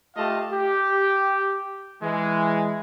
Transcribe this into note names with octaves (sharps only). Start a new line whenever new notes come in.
A3 F4 G4 D#5 F5 A5
G4
E3 G#3